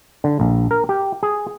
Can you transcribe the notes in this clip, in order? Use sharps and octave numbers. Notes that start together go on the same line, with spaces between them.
D3
A#1
A#4
G4
G#4